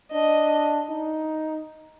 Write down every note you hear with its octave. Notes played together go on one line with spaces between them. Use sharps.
D4 D#5
D#4